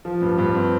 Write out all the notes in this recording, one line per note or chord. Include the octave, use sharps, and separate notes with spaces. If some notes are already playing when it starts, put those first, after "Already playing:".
F3
G2
G2
C4